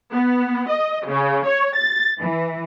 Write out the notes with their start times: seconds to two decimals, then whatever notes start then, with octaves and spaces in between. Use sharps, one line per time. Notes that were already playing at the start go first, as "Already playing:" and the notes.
0.13 B3
0.70 D#5
1.08 C#3
1.48 C#5
1.77 A6
2.18 E3